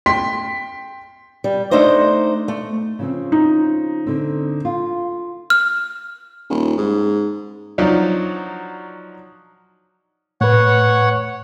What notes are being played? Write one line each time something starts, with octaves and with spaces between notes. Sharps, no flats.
G5 C6 B6
G3
A3 D4 D#4 C5 D#5
A3
C#3 F3 C4
D#4
D3 C4
F4
F6
D#1
G#2
F3 F#3 D4 D#4
A2 B4 C#5 F#5